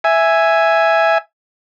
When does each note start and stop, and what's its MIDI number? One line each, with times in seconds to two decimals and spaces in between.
0.04 1.18 76
0.04 1.18 80